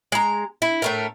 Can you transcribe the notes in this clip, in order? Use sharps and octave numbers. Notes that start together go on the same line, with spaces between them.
G#3 A#5
E4
A2 A3 A#4